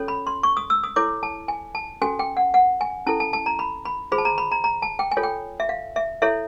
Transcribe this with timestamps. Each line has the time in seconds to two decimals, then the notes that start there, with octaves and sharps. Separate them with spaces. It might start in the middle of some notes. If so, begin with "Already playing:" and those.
Already playing: C#4 F4 A4 C#5
0.08 B5
0.27 C6
0.43 C#6
0.57 D#6
0.70 E6
0.83 D#6
0.96 E4 A4 C#5 D6
1.23 A5
1.48 G#5
1.75 A5
2.02 C#4 F#4 A4 G#5
2.19 G5
2.37 F#5
2.54 F#5
2.81 G#5
3.06 C#4 E4 A4 A5
3.20 A5
3.33 A5
3.46 A#5
3.59 B5
3.85 B5
4.12 F4 G#4 C5 B5
4.18 A5
4.25 A#5
4.38 B5
4.52 A#5
4.64 A#5
4.82 A5
4.99 G5
5.11 G#5
5.17 F4 A4 C#5
5.23 G5
5.60 E5
5.69 F5
5.96 E5
6.22 E4 A4 C#5 E5